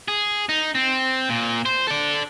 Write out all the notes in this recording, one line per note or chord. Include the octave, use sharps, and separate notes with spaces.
G#4
D#4
C4
A#2
C5
A4 D5